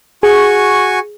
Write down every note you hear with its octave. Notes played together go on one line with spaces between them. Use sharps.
F#4 G#4 G#5 C#6